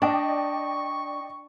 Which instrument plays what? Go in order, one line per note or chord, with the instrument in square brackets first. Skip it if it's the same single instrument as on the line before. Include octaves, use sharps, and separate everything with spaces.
[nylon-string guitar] D4 [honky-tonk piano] D5 D#5 G5 [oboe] C#6